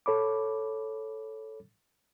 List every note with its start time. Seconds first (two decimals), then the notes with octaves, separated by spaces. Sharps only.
0.06 A4 C#5 B5 D6